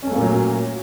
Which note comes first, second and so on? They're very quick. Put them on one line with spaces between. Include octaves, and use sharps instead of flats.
C#4 A3 A#3 A#2 F#3